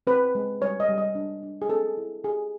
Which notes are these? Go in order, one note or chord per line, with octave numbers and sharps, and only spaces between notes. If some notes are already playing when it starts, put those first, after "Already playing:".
C4 B4
G#3
G3 C#5
D#5
G3
D#5
D4
D4
G#4
C4 A4
E4
G4 G#4